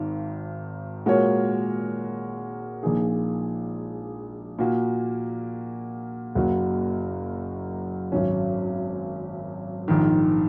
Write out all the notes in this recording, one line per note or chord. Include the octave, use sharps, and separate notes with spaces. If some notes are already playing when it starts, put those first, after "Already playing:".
Already playing: G#1 G#2 D#3
A#2 G#3 F#4 A#4 C#5
A#1 A#2 A#3 D#4 G#4
A#2 A#3 F#4
F#1 F#2 F#3 A#3 F#4
G#1 F#2 F#3 C#4
A#1 G#2 D#3